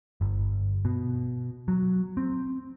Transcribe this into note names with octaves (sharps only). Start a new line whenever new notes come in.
G1
B2
F#3
C4